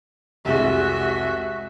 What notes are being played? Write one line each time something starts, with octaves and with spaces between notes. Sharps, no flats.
F1 C2 G#3 F#4 E5